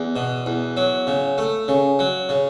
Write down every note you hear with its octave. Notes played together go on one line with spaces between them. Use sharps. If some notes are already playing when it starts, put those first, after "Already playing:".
Already playing: E2
B2
E2
F#3
C#3
A3
C#3
F#3
C#3